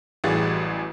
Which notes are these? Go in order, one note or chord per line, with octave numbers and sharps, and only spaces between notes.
A1 F#2 E3 G3 G#4 A6